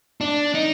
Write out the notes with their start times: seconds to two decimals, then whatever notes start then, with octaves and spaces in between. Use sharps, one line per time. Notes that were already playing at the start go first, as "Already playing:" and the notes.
0.21 D4
0.54 D#4